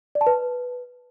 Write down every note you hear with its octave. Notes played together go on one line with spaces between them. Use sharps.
D5
A5
B4